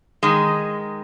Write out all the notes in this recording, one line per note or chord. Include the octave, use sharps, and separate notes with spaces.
D#3 G#3